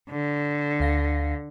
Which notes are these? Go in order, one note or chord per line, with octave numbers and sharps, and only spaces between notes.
D3
D2 F5 A#6